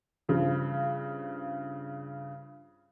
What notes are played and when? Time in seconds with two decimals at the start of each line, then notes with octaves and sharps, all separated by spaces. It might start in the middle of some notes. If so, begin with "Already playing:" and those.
0.29 G2 C#3 F3